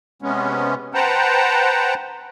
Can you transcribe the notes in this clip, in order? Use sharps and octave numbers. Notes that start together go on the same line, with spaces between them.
C3 G#3 B3 C#4
B4 C5 F#5 G5 A5 A#5